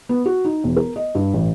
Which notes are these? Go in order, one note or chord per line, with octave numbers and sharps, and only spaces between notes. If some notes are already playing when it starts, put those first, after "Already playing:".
B3
F#4
D#4
E1
A#4
D#5
G2
A1